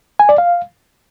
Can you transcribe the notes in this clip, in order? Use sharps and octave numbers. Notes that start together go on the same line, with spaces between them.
G#5
D5
F5